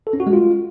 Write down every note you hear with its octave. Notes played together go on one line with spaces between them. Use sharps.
A4
C#4
F#4
G#3
F4